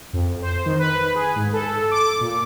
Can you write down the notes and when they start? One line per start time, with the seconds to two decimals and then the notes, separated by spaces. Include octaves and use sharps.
0.13 F2
0.42 C5
0.66 D#3
0.79 B4
1.15 G#4
1.36 G#2
1.53 A4
1.91 D6
2.21 A#2